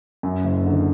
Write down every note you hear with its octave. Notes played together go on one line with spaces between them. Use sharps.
F#2
F#1
D3